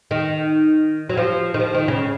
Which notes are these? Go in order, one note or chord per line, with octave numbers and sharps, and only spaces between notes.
D#3
F#3
F3
D#3
F3
D#3
C#3